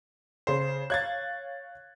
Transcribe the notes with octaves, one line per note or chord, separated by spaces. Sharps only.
C#3 C5 C7
C#5 F5 F#6 G#6 A6